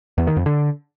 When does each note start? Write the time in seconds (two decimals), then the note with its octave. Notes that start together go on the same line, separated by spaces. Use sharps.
0.18 E2
0.27 D#3
0.37 F2
0.46 D3